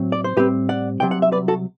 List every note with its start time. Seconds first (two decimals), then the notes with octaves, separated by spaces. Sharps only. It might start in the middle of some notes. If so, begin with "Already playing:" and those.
Already playing: A2 F#3 C4
0.12 D5
0.24 C5
0.37 A2 G3 C4 G4 B4
0.69 D5 F#5
1.00 C2 C3 F#3 G5
1.11 F#5
1.22 E5
1.32 B4 D5
1.48 F#4 A4